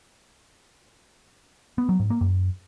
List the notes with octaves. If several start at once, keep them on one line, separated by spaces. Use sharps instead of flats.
B3
F#3
G#2
A#3
F#2